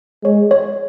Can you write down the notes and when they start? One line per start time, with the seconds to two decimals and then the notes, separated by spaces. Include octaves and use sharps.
0.24 G#3 C#5
0.51 C#5